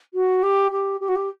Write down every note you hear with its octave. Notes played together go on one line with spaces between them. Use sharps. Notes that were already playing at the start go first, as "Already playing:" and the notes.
F#4
G4
G4
G4
F#4
G4